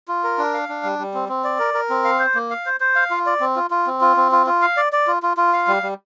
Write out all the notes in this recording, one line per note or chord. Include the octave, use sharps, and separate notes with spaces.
F4
A#4
D4
F5
D4
G3
G3
C4
C4
D5
A#4
A#4
C4
F5
C5
A#3
F5
C5
C5
F5
F4
D5
C4
F4
F4
C4
F4
C4
F4
F4
F5
D5
D5
F4
F4
F4
F5
G3
G3